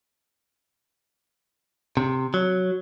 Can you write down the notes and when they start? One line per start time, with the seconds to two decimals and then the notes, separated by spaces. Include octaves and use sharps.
1.97 C3
2.34 F#3